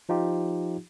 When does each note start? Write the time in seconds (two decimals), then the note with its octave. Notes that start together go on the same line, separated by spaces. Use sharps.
0.09 F3 D#4 F4 G4